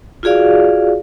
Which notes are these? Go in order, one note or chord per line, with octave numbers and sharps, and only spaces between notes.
F4 F#4 G#4 D5 F5